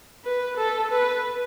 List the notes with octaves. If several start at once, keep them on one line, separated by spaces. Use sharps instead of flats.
B4
A4
B4